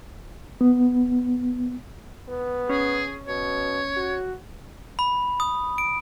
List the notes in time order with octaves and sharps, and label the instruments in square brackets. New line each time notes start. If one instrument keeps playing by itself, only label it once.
[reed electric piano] B3
[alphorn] B3
[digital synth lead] C#4 [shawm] G#4
[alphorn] B2 [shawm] C#5
[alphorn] F#4
[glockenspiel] B5
D#6
D7